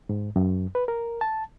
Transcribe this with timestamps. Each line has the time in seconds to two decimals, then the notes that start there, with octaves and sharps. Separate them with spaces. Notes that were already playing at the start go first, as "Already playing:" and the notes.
0.09 G#2
0.36 F#2
0.75 B4
0.88 A#4
1.21 A5